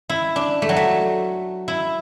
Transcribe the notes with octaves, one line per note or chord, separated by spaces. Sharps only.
E4
D4
A3
F#3
A3
E4